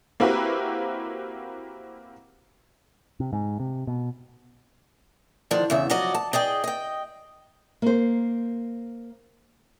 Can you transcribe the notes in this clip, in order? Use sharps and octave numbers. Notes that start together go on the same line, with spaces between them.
A#3 C4 E4 F#4 G4 B4
C3
G#2
C3
B2
D3 D#3 F3 D4
E2 C#3 E5
F3 F#3 F#4 D5 D#5
A5
G#4 D5 D#5 G5
D#5 G5
A#3 C5